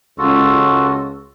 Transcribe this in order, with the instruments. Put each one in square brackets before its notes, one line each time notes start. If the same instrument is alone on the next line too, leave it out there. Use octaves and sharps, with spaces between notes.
[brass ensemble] C#2 [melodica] F4 F#4 A4